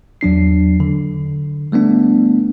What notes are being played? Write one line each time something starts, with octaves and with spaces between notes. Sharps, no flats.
E2 F#3 D4 C7
D3
G3 A3 B3 D4